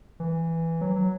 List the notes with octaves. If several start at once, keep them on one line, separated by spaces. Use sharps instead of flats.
E3
F#3
F#3